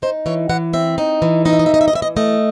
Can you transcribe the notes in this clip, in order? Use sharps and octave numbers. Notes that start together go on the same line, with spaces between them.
D#4 C5
E3 C#5
E3 F#5
C4 E5
D#4
E3
D#4 D#5
E5
D#5
E5
E3
D#5
E5
D#5
E3 E5
D#5
A3 D#5